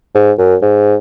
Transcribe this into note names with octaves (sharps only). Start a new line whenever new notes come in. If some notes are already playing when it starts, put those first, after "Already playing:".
G#2
F#2
G#2